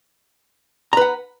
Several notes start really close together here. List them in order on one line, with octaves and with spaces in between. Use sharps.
A#5 B4 F#5